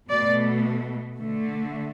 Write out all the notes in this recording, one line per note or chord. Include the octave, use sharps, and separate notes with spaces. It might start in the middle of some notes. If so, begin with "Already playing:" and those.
B2 A3 D5
D3 A3